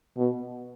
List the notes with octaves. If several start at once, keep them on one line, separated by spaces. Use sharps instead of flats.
B2